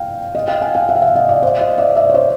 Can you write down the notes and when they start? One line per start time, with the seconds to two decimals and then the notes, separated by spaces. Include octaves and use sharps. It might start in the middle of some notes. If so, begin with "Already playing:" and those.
Already playing: F5 G5
0.35 D#5 F5
0.48 F5 G5
0.61 F#5 G#5
0.75 F5 G5
0.89 E5 F#5
0.96 F5
1.02 E5 F#5
1.16 D#5 F5
1.29 D5 E5
1.42 C5 D5
1.61 D#5 F5
1.78 D5 E5
1.96 D5 E5
2.10 C#5
2.14 C5 D5